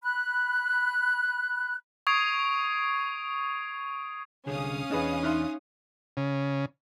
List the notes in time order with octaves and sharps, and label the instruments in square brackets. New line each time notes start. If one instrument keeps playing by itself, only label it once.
[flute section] B5 F#6
[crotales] C#6 D#6 G#6 C7 D7 F7
[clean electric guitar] C2 D3 G#4 [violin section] C#4 F5 D#6
[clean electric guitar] E2 D4 [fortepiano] D#4 G#4 B4
[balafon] D#4 E5 [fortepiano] C6 F6 F#6
[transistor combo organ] C#3